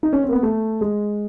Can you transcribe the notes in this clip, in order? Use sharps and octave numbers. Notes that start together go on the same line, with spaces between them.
D#4
C#4
C4
A#3
B3
A3
G#3